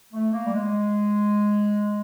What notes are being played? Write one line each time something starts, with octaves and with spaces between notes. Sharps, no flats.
A3
A#3
G3
G#3